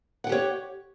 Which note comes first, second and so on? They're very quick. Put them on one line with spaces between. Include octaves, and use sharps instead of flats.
F#5 G5 G4 C#5